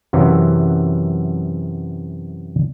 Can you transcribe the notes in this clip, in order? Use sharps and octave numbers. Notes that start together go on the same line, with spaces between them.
F#2 C3 E3 F#3